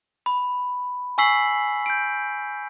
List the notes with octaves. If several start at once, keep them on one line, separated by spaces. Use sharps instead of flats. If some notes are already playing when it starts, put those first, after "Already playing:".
B5
G#5 C#6 E6 B6 C7 F#7
G6 D7